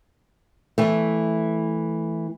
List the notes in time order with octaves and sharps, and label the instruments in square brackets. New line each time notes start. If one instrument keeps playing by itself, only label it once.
[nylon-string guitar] E3 A3